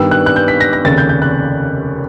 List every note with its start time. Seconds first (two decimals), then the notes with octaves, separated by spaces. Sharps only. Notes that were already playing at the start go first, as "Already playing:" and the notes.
Already playing: G2 D#3 G3 B3 E6
0.11 F#6
0.26 F#6
0.36 G6
0.48 B6
0.60 A#6
0.73 A#6
0.84 F1 D#2 C#3 A6
0.98 G6
1.09 G6
1.22 F#6